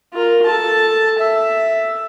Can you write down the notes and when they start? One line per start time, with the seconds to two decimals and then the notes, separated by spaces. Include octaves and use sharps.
0.13 F4 A#4
0.46 A4 A5
1.19 E5